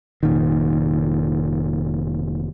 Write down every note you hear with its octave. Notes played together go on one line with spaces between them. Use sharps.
F1 A#2 D#3